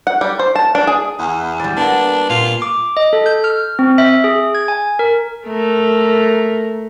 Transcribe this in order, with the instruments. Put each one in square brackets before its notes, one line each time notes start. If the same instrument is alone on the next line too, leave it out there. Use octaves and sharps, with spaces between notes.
[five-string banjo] F#5
G3
C5
A5
D4
G#4
[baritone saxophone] E2
[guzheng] G3 D5
[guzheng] A#3 B3 [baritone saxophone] D4
[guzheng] A#2 [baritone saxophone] F4
[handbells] D6
D#5
A4
G6
F6
C4
E5
G#4
G#6
G#5
A#4
[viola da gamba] A3 A#4